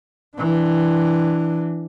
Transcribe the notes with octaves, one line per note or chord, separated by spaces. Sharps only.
E3 D4